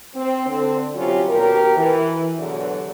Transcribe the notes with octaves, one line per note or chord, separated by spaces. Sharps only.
C4
D3 C4
C3 F#3 G3 C#4 F4 G4
D#2 B2 G4 A#4
E3
E2 B2 D3 F#3 G4 D5